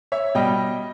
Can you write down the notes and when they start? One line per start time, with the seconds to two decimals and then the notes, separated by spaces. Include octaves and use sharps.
0.12 C#5 E5
0.35 B2 G3 D#5 G5